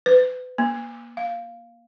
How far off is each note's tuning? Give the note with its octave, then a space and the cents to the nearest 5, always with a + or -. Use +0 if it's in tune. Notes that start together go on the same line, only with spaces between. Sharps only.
B4 +35
A#3 +25
F5 -5